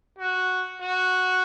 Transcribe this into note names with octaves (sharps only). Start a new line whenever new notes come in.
F#4
F#4